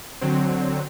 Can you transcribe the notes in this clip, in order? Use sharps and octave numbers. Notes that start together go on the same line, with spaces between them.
D3 F#3 C4